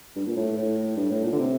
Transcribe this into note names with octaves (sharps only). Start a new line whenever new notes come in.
G2
A#2
A2
A2
G2
A2
A#2
D3
C3